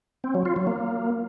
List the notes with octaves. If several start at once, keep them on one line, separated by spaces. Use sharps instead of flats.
C4
F#3
F4
F#3
A#3